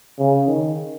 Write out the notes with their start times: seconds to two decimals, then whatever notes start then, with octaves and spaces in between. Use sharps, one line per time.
0.19 C#3
0.47 D#3